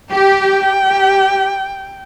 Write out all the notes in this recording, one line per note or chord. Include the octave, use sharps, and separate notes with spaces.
G4 G5
G4